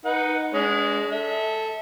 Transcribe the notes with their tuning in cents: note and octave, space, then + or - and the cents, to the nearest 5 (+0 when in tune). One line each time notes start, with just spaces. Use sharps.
D#4 +0 B4 +0 F#5 +0
G#3 +0 D4 -35
A4 +0 E5 -25